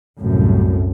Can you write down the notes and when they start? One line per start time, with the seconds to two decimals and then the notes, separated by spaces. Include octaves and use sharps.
0.21 C2 F#2 A2